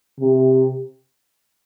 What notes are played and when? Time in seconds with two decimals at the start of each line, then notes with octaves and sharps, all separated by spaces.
0.20 C3